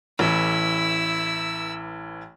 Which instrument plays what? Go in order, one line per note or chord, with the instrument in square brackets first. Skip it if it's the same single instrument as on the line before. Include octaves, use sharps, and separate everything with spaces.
[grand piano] A1 E3 [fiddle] E4 E6